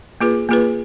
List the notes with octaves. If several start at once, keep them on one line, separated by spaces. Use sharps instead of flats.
A#3 F4 G#4 B4
A#3 F4 G#4 B4